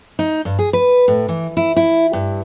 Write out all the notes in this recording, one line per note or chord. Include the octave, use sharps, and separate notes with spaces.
D#4
G2
G#4
B4
A2
E3
E4
E4
G2